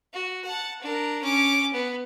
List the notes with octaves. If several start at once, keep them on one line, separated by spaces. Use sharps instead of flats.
F#4
F#5 A5
D4 A#4
C#4 D6
B3